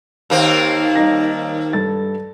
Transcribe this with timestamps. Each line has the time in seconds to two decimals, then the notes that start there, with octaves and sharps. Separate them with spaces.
0.30 D#2 A#3 C4
0.96 G3 D#4 A#6
1.73 G2 A4 A6